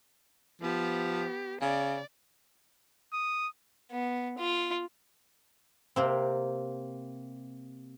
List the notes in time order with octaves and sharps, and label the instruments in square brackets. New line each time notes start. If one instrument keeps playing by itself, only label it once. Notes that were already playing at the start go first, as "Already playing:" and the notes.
[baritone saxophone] F3 [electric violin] B3 G4
[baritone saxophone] C#3 [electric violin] D5
[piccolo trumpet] D#6
[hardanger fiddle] B3
F4
[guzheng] C3 A#3 C4